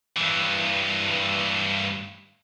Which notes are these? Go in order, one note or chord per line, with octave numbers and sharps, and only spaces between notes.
G2 E3